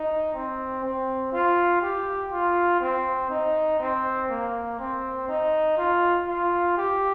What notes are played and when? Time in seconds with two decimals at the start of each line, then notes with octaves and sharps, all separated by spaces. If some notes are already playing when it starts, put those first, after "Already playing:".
Already playing: D#4
0.34 C4
0.84 C4
1.32 F4
1.82 G4
2.32 F4
2.81 C4
3.30 D#4
3.79 C4
4.30 A#3
4.79 C4
5.28 D#4
5.77 F4
6.28 F4
6.77 G4